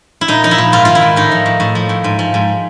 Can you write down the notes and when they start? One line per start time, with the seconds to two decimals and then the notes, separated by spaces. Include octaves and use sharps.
0.21 E4
0.28 A#2 D#4
0.44 F3 D#4
0.51 E4
0.58 A#2
0.72 G#2 F4
0.85 D#3 F4
0.95 E4
1.02 G#2
1.16 A2 D#4
1.32 F3
1.46 A2
1.60 A2
1.75 F3
1.89 A2
2.04 G#2
2.19 F3
2.34 G#2